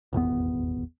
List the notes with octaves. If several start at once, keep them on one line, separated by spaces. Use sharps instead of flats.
D#1 G#1 E2 B3